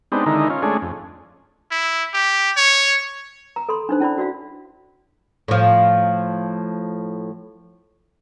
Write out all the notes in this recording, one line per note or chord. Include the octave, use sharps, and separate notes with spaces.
G#3 B3 C4 D4 D#4 G4
D3 D#3 G#3 D#4 E4 A#4
C#4 F4
G#3 A3 C#4 D4 G#4
F2
E4
G4
C#5
A#5
A4 B5 C6
D4 D#4 C5
C#4 E4 D5 B5
F#4 D5 F5
A2 F3